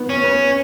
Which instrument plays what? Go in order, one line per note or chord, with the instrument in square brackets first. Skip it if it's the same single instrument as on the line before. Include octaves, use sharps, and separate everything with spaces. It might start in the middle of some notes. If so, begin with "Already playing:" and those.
Already playing: [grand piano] D#3 B3
[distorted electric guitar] C#4
[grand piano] B3